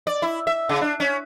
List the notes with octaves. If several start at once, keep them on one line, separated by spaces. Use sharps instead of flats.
D5
E4
E5
C#3
D4
C#4